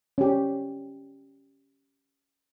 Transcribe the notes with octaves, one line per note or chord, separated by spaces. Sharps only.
C#4 G4